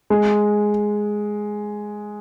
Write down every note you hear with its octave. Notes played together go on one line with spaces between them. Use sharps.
G#3